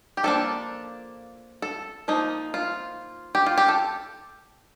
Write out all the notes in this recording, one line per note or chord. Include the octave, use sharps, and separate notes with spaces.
G4
F3 A#3 D4 A4
A4
F3 A#3 D#4
F4
G4
F4
G4
A4